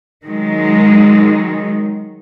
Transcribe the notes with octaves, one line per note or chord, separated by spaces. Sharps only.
D#3 F#3 G#3